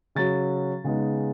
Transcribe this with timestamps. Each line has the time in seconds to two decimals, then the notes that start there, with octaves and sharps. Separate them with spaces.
0.15 C#3 F#3 C#4 A6
0.84 C#3 G#3 B3 D#4